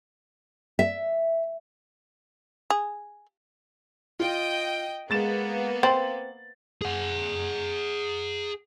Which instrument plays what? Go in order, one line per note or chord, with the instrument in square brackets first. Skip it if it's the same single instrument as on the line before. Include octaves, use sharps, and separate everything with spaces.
[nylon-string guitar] E5
[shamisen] G#4
[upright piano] F4 [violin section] D#5 G5
[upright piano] G#3 A6 E7 [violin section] A#3 B3
[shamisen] C4 [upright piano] A6 F#7
[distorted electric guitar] G#4 F#5